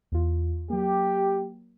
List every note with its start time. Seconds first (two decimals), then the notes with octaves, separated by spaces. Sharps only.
0.12 E2 F4
0.70 F#3 A#3 G4